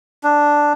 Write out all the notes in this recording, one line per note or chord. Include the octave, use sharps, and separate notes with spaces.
D4